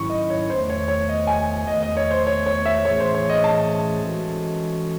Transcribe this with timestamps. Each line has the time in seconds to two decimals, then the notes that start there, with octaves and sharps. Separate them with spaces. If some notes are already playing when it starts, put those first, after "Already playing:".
Already playing: G#2 D#3 F#3 C#4 E4 C#6
0.10 D#5
0.30 C#5
0.50 E2 D#3 A3 C5
0.69 C#5
0.88 C#5
1.09 D#5
1.27 G#5
1.67 E2 D#3 A3 D#5
1.82 D#5
1.97 C#5
2.11 C5
2.27 C#5
2.46 C#5
2.66 E5
2.84 A2 E3 A3 C#4 G#4 C#5
3.00 C5
3.15 C#5
3.29 D#5
3.44 A5
4.02 E3 G#3 C#4 F#4 A4